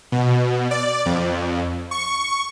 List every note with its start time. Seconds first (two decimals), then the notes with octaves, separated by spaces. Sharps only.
0.12 B2
0.71 D5
1.06 F2
1.91 C#6